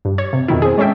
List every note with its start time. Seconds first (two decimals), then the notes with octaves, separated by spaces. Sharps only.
0.05 G2
0.18 C#5
0.33 C3
0.48 F2 B2 D#3 E4
0.62 C4 G#4
0.78 G#3 C#4 A4 E5 G5